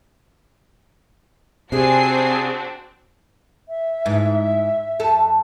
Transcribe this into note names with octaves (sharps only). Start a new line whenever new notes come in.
C3 C4 D4 F#4 G#4 G#5 C7
E5
G#2 E3
F2 A4